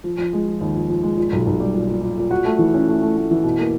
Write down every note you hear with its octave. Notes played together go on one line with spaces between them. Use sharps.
F3
F3
G#3
F3
D#2
F3
F3
G#3
A#2
B1
B1
G3
A#2
A#2
A#2
A#2
F#4
A3
E3
C#4
A3
A3
A3
E3
B2
A#3